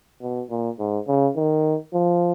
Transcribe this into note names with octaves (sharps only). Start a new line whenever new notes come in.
B2
A#2
G#2
C#3
D#3
F3